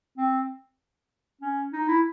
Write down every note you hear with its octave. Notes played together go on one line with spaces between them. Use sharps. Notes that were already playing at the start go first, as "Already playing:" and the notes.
C4
C#4
D#4
E4